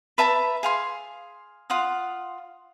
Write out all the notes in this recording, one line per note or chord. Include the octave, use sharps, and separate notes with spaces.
B4 E5 A5 A#5
G#4 F5 C6
F4 F5 F#5 D#6